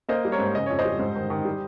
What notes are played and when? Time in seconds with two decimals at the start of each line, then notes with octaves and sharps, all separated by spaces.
0.09 A#3 C5 D#5
0.25 G3
0.32 A#4 C#5
0.39 G#2
0.55 C#3 D#5
0.66 F2 C#5
0.79 C5 D#5
0.85 G3
0.99 G#2
1.16 D#3
1.30 D#3
1.45 G3